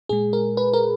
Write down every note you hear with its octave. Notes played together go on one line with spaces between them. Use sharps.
A#2 G#3 G#4
A#4
B4
A#4